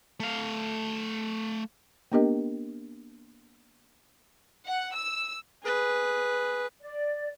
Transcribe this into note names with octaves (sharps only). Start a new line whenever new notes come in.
A3 F5
A#3 B3 D4 G4 A#4 D#5
F#5
E6
G#4 B4
D5